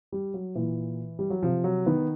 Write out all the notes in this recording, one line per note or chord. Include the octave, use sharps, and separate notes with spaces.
G3
F#3
A#2 E3
G3
F#3
C3 F3
F#3
D#3 B3